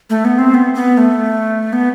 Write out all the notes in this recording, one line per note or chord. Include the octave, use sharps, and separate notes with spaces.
A3
B3
C4
B3
B3
B3
A3
B3